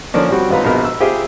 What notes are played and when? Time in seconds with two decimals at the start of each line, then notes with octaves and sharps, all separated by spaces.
0.14 D3 F3 A#3 C#4 D4
0.30 G3 C4 F#4
0.50 G#1 C4 F4 B4 A#5
0.64 A#1 B2 A#4
0.84 E6
1.00 F4 G4 G#4 C5 E5